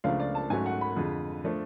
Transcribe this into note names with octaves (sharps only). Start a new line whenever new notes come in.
C#2 C#3 F3 A3 D4 F5
D5
A5
G#2 F#3 A3 C#4 G#5
F#5
B5
F2 D3 G#3
F3 A3 D4